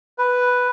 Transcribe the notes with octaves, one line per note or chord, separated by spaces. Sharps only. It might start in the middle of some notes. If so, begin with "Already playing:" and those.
B4